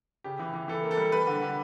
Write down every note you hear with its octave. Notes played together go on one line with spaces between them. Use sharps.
C#3 G4
E3
E3
E3 A4
A#3
A4
G3
G3 B4
D3
D3